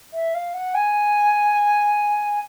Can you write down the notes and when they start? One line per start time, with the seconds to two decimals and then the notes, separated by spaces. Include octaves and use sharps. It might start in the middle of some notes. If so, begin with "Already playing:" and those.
0.13 E5
0.34 F5
0.53 F#5
0.74 G#5